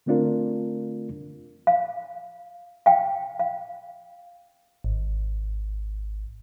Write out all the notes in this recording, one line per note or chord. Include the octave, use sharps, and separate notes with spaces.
D3 A3 C4 D4 F4 A#4
F5
F5 G5
F5
G#1